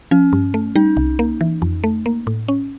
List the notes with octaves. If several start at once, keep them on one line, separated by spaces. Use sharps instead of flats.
F3 C#4
G2
A3
G3 D#4
C2
A#3
E3
F2
A3
A#3
A2
C#4